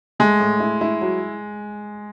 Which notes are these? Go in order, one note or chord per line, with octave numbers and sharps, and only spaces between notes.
G#3 A3
A2
E4
E4
F#3